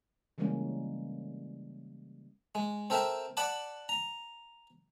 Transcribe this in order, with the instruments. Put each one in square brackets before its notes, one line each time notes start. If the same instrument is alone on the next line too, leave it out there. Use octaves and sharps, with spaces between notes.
[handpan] C#3 E3 G3 G#3 A#3 C#4
[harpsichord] G#3
C4 A4 A#4 E5
D5 F#5 A5 B5 D6
A#5